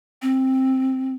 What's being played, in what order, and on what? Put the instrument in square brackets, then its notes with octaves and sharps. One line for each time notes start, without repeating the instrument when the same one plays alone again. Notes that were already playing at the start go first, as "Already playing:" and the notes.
[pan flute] C4